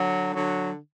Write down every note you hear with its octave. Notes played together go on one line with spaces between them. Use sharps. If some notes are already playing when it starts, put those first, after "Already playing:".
Already playing: D3 F#3
D3 F#3